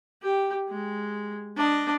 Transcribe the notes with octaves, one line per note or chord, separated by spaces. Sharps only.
G4
G#3
D4 D#5